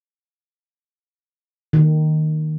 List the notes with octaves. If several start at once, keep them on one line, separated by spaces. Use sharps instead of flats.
D#3